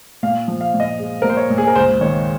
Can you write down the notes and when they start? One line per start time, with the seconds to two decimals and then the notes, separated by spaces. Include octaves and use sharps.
0.23 A#2 F5
0.48 F3
0.61 F5
0.74 A#2
0.80 D#5
0.99 G#3
1.22 A#2 A#4
1.30 C5
1.37 C#5
1.50 A#2
1.58 G#4
1.67 A#4
1.75 C#2 C5
2.01 D#3 C#5